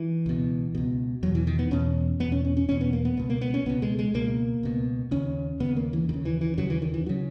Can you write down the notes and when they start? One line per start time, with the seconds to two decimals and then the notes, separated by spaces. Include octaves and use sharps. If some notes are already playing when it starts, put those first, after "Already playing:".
Already playing: E3
0.26 C#2 B2
0.75 C#2 B2
1.23 E2 B2 F#3
1.35 E3
1.47 D#3
1.59 B3
1.71 E2 B2 C#4
2.20 E2 B2 B3
2.32 C#4
2.45 C#4
2.57 C#4
2.69 E2 B2 C#4
2.81 B3
2.93 A#3
3.05 B3
3.17 C#2 B2 B3
3.30 A#3
3.41 B3
3.54 C#4
3.66 C#2 B2 B3
3.82 G#3
3.99 G#3
4.14 C#2 B2 A#3
4.63 C#2 B2
5.11 D#2 C#3 C#4
5.60 D#2 C#3 B3
5.76 A#3
5.93 E3
6.09 D#2 D#3
6.13 C#3
6.25 E3
6.41 E3
6.58 D#2 C#3 F#3
6.70 E3
6.82 D#3
6.94 E3
7.06 C#3 F#3